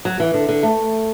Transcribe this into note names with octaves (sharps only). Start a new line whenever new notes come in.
F#3
E3
D3
D3
A3